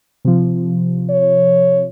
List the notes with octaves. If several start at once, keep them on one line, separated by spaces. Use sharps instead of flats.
C3 F3
C#5